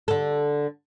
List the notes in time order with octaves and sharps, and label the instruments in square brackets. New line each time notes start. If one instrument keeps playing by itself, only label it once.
[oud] D3 A4